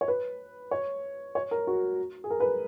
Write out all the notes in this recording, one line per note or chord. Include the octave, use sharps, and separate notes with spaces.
C#5
B4
C#5
C#5
A#4
F#4
G#4
A#4
B4